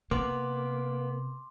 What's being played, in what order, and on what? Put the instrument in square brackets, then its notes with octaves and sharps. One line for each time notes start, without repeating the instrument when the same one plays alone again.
[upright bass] C3 [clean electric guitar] A#3 B3 [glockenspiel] C6 D6